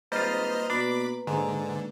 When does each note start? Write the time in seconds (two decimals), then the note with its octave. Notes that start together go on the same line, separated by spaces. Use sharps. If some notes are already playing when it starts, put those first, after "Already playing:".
0.12 G#1 G3 A#3 F4 B4 C5 D#5 F6
0.70 B2 D4 B5 D6
1.27 G#2 D3 G#3